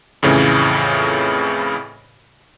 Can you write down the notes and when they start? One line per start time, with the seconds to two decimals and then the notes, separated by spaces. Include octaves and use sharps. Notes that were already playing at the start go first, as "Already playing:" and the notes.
0.23 F2 A2 C#3 E3